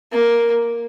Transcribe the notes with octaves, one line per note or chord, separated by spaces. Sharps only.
A#3